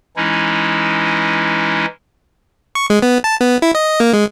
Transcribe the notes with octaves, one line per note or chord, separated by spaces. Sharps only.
E3 G#3 C#4 D#4 E4
C#6
G#3
B3
A5
B3
E4
D#5
A#3
G#3